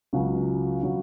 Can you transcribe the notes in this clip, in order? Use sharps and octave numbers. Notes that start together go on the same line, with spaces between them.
C#2 C#3 F#3
C#3 F#3